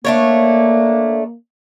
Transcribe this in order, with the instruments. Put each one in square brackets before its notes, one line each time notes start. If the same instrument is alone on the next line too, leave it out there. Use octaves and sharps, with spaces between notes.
[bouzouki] A3 D4 C#5 [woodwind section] A#3